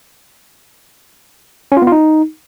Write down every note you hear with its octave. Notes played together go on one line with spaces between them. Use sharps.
C#4
F4
B3
F4
D#4